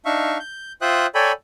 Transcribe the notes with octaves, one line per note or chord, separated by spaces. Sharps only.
D4 D#4 E5 F5 C#6
G6
F4 C5 E5 G5 D#6 F#6
A4 C#5 D5 G5 G#5 B5